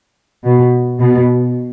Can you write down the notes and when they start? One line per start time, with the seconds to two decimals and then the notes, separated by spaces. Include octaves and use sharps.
0.45 B2
1.00 B2